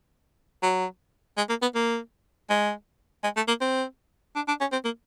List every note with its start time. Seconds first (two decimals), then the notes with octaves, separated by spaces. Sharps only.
0.63 F#3
1.37 G#3
1.49 A#3
1.62 B3
1.75 A#3
2.49 G#3
3.23 G#3
3.36 A3
3.48 A#3
3.61 C4
4.35 D4
4.48 D4
4.60 C#4
4.72 C4
4.85 A#3